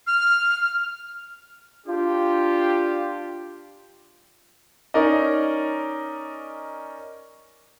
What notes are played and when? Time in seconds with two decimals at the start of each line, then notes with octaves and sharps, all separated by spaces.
0.07 F6
1.87 D4 F4 G4
4.94 C#4 D#4 A#4 D5 D#5